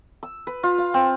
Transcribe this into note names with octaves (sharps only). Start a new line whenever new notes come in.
E6
B4
F4
F5
C4